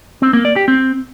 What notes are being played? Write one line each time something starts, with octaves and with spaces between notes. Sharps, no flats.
C4
A#3
D5
G4
C4